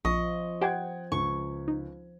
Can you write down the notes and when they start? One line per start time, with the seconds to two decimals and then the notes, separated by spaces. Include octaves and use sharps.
0.05 A#1 F3 D#5 C#6
0.61 G4 C5 F#5 G5 G#6 D7
1.12 C#2 C#6
1.68 D#4